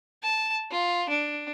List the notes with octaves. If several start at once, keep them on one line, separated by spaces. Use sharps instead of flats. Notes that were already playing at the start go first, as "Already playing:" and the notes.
A5
F4
D4